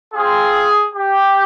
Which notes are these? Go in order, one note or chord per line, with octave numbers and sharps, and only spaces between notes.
C4 F4 G#4
G4